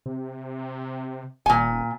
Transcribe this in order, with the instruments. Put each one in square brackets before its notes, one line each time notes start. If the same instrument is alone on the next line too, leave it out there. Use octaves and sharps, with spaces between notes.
[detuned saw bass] C3
[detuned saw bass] D#1 [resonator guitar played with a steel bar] A#2 G#5